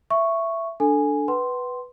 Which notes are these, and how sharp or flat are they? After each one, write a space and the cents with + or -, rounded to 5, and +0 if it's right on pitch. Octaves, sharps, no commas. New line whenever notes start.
E5 +15 C#6 +0
D4 +0 A4 +0 G#5 +0
B4 +0 F#5 +40 C6 +0